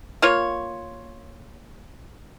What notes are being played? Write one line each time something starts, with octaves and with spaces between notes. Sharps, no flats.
A#3 F4 C#5